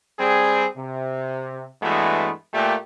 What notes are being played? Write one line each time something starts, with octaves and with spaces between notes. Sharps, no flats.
G3 C4 G#4
C3
G2 E3 G#3 A3 B3 F#4
A#2 A3 G4